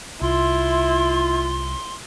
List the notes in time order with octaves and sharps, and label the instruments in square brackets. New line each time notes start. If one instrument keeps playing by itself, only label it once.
[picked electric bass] C2 [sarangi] E4 [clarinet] F4 [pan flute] C6